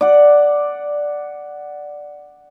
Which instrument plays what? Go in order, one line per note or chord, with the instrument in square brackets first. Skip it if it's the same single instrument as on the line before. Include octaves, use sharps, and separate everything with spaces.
[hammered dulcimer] D5 F#5